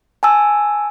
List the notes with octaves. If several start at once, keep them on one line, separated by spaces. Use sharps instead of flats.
G#5 A5 E6